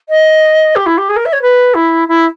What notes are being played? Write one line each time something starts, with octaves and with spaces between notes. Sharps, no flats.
D#5
G4
E4
G4
G#4
A#4
E5
C#5
B4
E4
E4